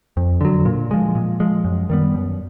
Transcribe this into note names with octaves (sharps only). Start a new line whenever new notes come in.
F2
D3 F#3
A#2
F3 G#3
A#2
F3 G#3
F#2
D#3 G3 B3
F#2